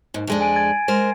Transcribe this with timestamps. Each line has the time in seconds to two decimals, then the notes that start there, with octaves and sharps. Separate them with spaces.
0.14 D#2 G#2
0.27 F2 G#3 D4
0.41 G#5 D7 D#7
0.56 G#6 A6 D7
0.88 G#3 A#4 C5